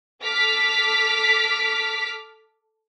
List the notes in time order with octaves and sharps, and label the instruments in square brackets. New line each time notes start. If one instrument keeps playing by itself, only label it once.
[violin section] A4 D6 F6 B6